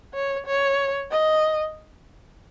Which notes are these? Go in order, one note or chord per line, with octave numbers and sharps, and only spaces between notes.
C#5
C#5
D#5